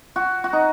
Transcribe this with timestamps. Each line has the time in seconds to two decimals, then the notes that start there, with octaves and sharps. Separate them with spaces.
0.16 F#4
0.44 F#4
0.53 D#4